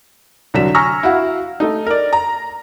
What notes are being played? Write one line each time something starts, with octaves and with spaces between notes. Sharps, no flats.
C2 D3 F#3 B6 E7
G#5 A#5 C#6 E6 F6 A#6
E4 F#4 F5 F#5
A3 D#4
A#4 D5
A#5